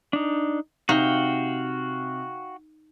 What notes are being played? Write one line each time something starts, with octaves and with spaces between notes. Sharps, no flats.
D4 D#4
C3 D#4 F#4 F5 G5